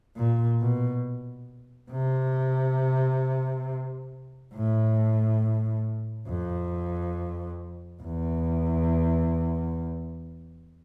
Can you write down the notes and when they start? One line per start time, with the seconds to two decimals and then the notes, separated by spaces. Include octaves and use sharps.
0.17 A#2
0.60 B2
1.92 C3
4.54 A2
6.28 F2
8.02 E2